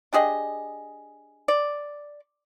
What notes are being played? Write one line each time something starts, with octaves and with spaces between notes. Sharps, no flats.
D4 G4 G#4 D#5
D5